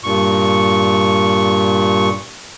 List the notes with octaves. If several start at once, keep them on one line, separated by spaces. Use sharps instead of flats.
G2 A#2 C#6